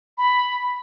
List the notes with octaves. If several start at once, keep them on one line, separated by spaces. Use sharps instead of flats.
B5